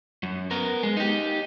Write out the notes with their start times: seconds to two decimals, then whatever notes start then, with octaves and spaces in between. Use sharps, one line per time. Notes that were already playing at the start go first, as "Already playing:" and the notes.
0.23 F#2
0.51 B3 A#4
0.83 G#3
0.97 D#4 G4